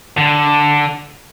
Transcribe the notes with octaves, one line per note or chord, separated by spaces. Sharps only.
D3